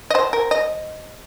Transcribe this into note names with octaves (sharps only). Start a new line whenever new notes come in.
D#5
C5
A#4
D#5